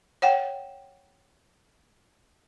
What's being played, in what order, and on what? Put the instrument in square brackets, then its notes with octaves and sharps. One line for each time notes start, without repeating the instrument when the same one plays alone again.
[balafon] C#5 F#5 G5